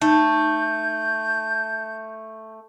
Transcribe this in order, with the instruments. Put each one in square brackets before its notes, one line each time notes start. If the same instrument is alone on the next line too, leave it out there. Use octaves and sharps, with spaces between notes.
[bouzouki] A3 [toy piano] D#4 [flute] G6